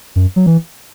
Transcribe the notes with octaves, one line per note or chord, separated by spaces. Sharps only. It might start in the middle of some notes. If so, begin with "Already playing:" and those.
F#2
F#3
E3